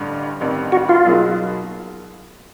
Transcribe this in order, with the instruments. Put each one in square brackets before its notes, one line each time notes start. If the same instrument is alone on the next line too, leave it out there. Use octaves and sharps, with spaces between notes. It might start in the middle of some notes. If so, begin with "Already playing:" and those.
Already playing: [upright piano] A1 G2 D3
A1 G2 D#3 G3 C4
[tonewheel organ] F#4
F4
[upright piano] B2 F#3 A#3 D#4 G#4